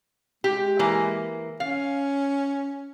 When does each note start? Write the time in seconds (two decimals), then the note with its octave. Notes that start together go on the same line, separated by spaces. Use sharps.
0.44 G#3 G4
0.79 E3 A#3
1.60 C#4 F5